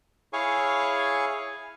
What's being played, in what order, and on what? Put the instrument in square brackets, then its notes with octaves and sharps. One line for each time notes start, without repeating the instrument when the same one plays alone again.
[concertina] E4 G#4 C#5 F5 G#5 C#6